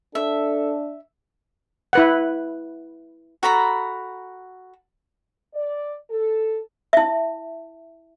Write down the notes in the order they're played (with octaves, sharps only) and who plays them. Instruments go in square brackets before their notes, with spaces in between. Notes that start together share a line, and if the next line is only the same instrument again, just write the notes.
[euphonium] D4 [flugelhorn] A4 [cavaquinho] E5
[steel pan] E4 B4 F#5
[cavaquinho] F#4 A4 A#5 B5
[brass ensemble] D5
A4
[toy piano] E4 E5